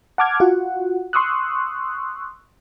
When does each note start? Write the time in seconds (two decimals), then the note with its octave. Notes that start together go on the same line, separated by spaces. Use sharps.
0.18 F#5 A5 D6 F6 G#6
0.40 F4 F#4 F#5
1.13 C6 C#6 D#6 E6 F#6